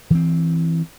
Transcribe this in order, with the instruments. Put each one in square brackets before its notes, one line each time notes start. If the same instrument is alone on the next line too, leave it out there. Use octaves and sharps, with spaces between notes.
[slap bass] E3 C4